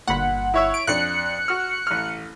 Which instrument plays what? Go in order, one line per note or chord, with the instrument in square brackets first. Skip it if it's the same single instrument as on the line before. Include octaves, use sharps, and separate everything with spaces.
[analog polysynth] G1 F#5 [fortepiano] A#2 B5
[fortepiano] E4 C#5 E5
[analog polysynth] D7
[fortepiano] F2 D4 [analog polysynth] F#6 C#7
[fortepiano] F#4 F6
A1 F6